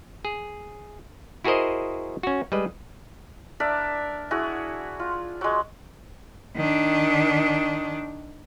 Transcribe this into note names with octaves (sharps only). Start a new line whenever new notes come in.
G#4
E4 F#4 G#4 A#4 C5 D#5
C#4 F#4
G3 G#3 G#4 B4 D#5
D4 A#4 D5 E5
E4 F#4 G#4
F4
F#3 G#3
D#3 D4